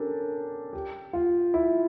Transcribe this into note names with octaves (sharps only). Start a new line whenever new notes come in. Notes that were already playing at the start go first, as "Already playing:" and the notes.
Already playing: C#4 D4 G4 A4 A#4
G4
F4
E4